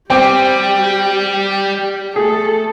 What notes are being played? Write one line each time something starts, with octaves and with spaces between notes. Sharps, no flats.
G3 C4 G4 G5 D6
A3 G#4 A4